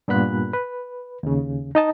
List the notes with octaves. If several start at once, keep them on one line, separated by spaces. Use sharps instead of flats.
G2 A#2 B3 B5 F#6
B4
D#2 C#3
D#4 D#5 A5